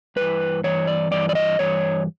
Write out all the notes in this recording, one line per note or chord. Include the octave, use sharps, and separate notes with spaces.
G2 E3 B4
G2 E3 C#5
D5
G2 E3 D5
D5
D#5
G2 E3 C#5